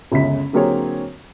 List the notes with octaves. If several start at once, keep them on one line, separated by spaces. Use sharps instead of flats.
G1 C#2 F#2 C#3 G#3 B6
D3 F#3 A#3 C4 G#4 C#5